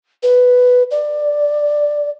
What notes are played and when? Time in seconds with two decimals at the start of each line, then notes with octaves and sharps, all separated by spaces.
0.23 B4
0.91 D5